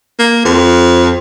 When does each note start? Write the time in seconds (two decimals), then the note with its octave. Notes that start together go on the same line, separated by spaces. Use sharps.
0.19 A#3
0.45 F2